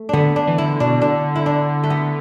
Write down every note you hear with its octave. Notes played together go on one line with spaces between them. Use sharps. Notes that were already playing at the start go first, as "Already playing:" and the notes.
Already playing: A3
D3 B3 D4
D4
E3
D3 E4
B2 D4
D3 D4
E4
D4
A3
B3